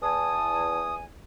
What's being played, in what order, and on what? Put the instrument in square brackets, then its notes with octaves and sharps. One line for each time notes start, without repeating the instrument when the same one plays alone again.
[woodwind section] E2 G#5 [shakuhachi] A5 [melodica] D#6